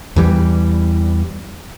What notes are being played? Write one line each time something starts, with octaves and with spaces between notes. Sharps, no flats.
E2 E3 G3